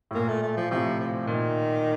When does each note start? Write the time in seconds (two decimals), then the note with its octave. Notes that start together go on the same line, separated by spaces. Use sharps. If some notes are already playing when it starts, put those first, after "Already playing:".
0.11 A2
0.15 A#2 A#3
0.28 A3
0.43 A3
0.57 F3
0.71 A2 C3 F3
1.00 F3
1.27 A#2 D#3